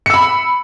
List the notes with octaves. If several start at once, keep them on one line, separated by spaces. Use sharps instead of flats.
B5 E6 C#7